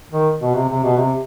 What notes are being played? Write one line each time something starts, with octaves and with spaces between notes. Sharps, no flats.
D#3
B2
C3
C3
B2
C3